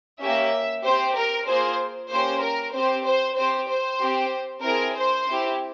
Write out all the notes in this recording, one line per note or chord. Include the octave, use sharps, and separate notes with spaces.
A#3 C#4 G4 E5
C4 G4 C5
A#4
A#3 F4 G#4 C5
A#3 C#4 G4 C5
A#4
C4 G4 C5
C5
C4 G4 C5
C5
C4 G4
C4 E4 G#4 A#4
C5
C4 E4 G4